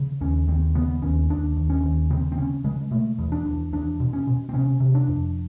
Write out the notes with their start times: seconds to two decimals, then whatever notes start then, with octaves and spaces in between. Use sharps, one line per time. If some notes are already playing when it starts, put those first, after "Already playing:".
Already playing: C#3
0.21 D#2 C#4
0.48 D#2 C4
0.75 C#3 B3
1.02 D#2 C#4
1.30 D#2 D4
1.56 D#2
1.70 C#4
1.83 D#2
2.10 C#3 C4
2.32 C4
2.38 C#3 C#4
2.64 C#3 G#3
2.91 B2 A3
3.19 E2
3.32 D4
3.45 E2
3.73 E2 D4
4.00 B2
4.13 C#4
4.27 B2
4.49 C4
4.53 C3 C#4
4.80 C3
4.95 D4
5.08 F2